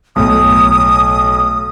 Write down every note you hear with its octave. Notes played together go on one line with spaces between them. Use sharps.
B1 A2 D#6